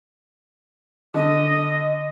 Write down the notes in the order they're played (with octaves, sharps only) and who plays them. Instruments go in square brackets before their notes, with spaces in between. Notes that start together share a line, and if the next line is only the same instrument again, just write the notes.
[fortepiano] D3 [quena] D#5